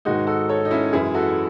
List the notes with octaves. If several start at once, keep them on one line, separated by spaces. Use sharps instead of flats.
G#2 D#3 G#3 D#4 F#4
F#4 A4
A4 C#5
D#4
C#4 E4
F#2 E3 G#3 E4 G#4
F#4 A4